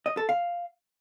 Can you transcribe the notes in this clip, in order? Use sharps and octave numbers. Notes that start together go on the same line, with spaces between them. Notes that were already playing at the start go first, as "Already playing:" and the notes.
D#5
A4
F5